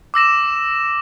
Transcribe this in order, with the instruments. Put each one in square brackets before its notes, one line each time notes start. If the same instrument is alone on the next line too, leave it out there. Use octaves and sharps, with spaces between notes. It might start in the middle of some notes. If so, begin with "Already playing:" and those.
[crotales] D6 E6 A#6 E7